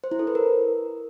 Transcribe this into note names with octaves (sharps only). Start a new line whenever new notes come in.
C5
E4
A4
B4
A#4